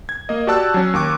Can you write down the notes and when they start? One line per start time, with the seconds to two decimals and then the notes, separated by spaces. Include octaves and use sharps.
0.09 G#6
0.29 A#3 D#5
0.47 F#4 G4 D5 A5 E6 F#6
0.74 F#3 C#4
0.93 D#2 C#6 D6 F#6